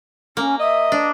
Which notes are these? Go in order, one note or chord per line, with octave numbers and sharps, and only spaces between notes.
A#3 C#4
D#5 E5
D4